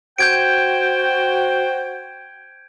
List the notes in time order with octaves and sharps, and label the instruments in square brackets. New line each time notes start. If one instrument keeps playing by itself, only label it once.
[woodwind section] F#4 C5 G5 [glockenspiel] G6 G#6 D7